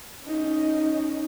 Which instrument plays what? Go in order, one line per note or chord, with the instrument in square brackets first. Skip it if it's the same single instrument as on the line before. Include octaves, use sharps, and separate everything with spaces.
[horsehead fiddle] C#4 D#4